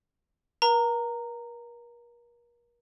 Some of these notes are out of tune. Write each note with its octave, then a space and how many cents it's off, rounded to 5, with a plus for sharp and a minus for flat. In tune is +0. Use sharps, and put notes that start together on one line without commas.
A#4 +40 A#5 -15